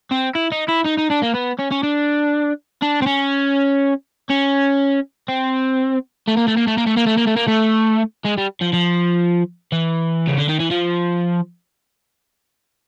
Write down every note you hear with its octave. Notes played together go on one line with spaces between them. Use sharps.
C4
E4
D#4
E4
D#4
D#4
D4
A#3
B3
C#4
C#4
D4
D4
C4
C#4
C#4
C4
A3
A#3
A3
A#3
A3
A#3
A3
A#3
A3
A#3
A3
A#3
A3
G#3
G3
F3
F3
E3
C#3
D3
D#3
E3
F3